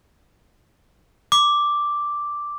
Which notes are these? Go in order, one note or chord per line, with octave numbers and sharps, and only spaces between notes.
D6